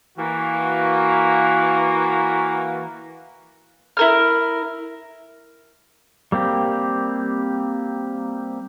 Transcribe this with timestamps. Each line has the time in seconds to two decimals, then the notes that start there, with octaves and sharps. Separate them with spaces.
0.18 E3 A#3 F#4
3.97 E4 A#4 F6
6.32 G3 A#3 C4 G4